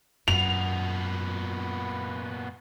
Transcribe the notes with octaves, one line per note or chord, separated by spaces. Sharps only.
F#2 A#2 B3 F7